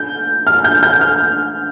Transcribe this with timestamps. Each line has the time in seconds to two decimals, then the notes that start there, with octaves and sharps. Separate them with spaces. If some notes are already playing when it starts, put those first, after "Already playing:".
Already playing: G6
0.47 F6
0.64 G6
0.83 G6
1.01 F6